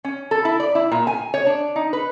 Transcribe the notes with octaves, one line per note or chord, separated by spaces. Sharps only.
C#4
A4
E4
D5
E4
A#2
G#5
C#5
D4
D#4
B4